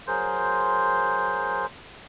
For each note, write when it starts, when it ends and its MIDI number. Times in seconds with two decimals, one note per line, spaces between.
0.08 1.66 54
0.08 1.66 68
0.08 1.66 70
0.08 1.66 72
0.08 1.66 84
0.08 1.66 91